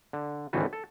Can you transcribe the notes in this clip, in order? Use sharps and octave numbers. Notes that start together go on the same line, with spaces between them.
D3
G#1 D2 A2 E3 A4 B4
A4